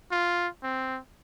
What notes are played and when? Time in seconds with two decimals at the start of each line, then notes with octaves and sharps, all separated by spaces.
0.12 F4
0.63 C4